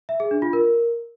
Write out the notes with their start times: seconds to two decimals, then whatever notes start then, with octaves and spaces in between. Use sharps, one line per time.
0.09 E5
0.20 G#4
0.31 D4
0.42 F4
0.53 A#4